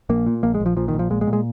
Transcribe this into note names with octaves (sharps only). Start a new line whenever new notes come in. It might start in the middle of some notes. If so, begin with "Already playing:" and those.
A#1 A#3
A#2
A#1 A#3
G#3
A#1
F3
A#2 F3
D#3
A#1
F3
A#2 G#3
G#3
A#2
G#3